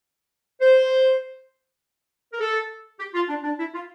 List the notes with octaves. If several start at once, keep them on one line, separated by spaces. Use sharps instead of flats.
C5
A#4
A4
G4
F4
D4
D4
E4
F4